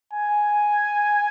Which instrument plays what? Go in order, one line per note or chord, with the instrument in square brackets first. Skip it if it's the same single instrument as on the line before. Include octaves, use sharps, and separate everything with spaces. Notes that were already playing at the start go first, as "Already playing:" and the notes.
[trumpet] G#5